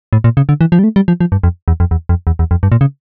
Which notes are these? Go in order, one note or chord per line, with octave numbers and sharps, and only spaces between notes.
A2
A#2
C#3
D3
E3
F3
G3
A3
G3
F3
F3
G2
F2
E2
F2
E2
F2
E2
E2
F2
G2
A#2
C#3